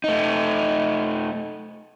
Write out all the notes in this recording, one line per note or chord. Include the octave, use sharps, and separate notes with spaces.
A3 D#4